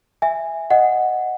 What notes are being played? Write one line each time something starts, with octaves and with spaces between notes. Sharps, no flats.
E5 G#5
D#5 F#5